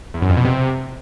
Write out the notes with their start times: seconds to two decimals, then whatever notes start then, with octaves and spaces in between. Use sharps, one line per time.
0.14 E2
0.22 F#2
0.30 F2
0.37 B2
0.45 C3